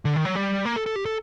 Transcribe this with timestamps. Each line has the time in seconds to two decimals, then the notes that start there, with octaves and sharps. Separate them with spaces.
0.05 D3
0.16 D#3
0.25 F#3
0.35 G3
0.65 A#3
0.76 A4
0.86 A4
0.96 G4
1.06 A4